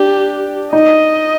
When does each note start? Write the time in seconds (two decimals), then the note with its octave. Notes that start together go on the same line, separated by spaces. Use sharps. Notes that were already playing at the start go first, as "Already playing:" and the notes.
Already playing: D4 G4
0.73 D#4 D#5